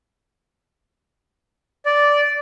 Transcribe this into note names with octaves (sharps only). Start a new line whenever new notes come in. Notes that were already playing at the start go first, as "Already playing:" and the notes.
D5